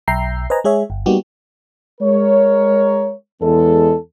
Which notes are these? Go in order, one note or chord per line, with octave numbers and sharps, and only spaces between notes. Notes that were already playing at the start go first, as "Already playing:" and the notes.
B1 E5 G5 A#5 G6 C7
B4 C5 D#5 G#5 A#5
G#3 G#4 C#5 E5
G1
G3 A#3 B3 D#4 F#4 G4
G#3 A#4 C#5
E2 G#3 A4